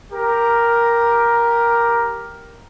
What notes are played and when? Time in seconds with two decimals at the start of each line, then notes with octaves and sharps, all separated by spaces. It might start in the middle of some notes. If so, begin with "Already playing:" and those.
0.12 G4 A#4